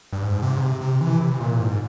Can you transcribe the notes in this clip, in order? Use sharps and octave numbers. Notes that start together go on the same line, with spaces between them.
G2
G#2
C3
C#3
C3
C3
E3
C3
A#2
G#2